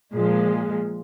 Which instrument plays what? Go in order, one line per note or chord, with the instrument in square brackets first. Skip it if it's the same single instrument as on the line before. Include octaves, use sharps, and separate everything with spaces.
[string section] A#2 F3 G#3